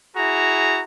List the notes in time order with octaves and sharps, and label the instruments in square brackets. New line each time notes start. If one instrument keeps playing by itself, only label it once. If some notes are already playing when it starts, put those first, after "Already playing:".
[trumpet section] E4 F#4 G#4 A#5